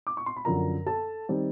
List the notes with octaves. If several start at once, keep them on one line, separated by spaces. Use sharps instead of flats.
D6
C#6
C6
B5
F#2 D3 F3 A#4 A#5
A4 A5
D#3 G3 C4